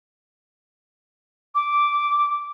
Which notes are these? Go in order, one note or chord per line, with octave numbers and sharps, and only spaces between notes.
D6